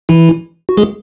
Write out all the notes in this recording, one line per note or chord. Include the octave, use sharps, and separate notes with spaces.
E3 E4
F#4
G#3 G#4